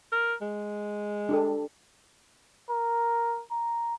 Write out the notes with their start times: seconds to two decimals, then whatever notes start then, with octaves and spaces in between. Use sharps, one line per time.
0.12 A#4
0.42 G#3
1.29 D4 G4 A4
2.71 A#4
3.51 A#5